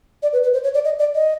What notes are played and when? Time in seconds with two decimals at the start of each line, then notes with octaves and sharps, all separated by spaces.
0.23 D5
0.33 B4
0.43 B4
0.53 C5
0.64 C#5
0.74 D5
0.85 D#5
0.99 D5
1.15 D#5